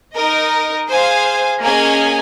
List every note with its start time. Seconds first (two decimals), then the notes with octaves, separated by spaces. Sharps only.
0.14 D#4 A#4 D#5
0.89 G#4 C5 F5 G#5
1.62 A#3 C#4 G#4 D#5 G#5